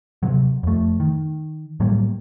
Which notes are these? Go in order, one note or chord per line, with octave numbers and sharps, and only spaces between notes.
C3 F#3
F2 A3
D#3
A2 F#3 G3 A#3